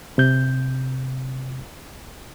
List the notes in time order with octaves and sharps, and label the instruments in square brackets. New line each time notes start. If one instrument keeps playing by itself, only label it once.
[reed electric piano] C3 G6